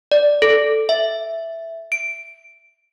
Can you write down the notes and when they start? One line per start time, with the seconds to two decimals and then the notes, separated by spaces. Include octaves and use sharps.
0.11 D5
0.42 A4
0.89 E5
1.92 D7